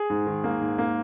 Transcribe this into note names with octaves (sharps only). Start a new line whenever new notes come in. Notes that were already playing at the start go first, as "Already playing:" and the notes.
Already playing: G#4
G#2
D#3
A#3
G#2
A#3